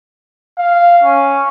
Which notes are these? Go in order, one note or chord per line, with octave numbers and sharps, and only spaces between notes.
F5
C#4